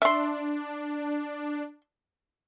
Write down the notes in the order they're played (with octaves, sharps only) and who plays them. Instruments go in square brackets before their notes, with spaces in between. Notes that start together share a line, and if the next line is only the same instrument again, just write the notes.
[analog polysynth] D4 [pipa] E5 C6